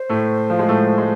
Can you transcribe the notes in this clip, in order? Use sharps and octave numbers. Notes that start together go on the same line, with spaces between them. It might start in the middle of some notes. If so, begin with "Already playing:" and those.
Already playing: C5
A2 A3
F3
G#3
A2 A3
G#3